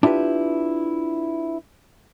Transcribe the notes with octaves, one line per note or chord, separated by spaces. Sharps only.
D4 E4 F4 G4 B4